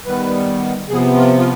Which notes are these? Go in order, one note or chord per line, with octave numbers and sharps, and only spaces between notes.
D#3 G3 B3 B4
C3 F3 B3 G#4
F4
F4